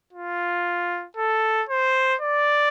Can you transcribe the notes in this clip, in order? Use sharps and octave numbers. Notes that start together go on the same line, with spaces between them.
F4
A4
C5
D5